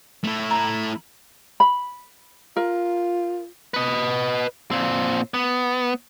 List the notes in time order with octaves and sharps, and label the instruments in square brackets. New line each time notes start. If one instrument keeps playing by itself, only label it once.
[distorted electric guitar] A3 E4
[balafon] A#5
[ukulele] B5
[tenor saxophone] F4 [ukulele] A#4
[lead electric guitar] B4 D#5
A#2 C4
B3